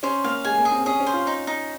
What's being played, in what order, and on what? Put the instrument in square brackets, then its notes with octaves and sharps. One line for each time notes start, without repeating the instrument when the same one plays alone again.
[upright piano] C#4 [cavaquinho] C5
[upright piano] A#3 [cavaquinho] F5
[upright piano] G#3 [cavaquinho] G#5
[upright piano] A#3
[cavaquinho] G#4
[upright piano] C4
[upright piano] C#4 [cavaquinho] G#4
[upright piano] C#4
[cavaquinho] C5
[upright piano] F4
[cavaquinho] D#4
D#4